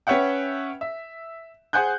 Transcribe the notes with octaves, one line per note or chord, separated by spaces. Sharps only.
C#4 B4 C#5 E5 F#5 G5
E5
G#4 C5 F#5 G#5 F#6 G6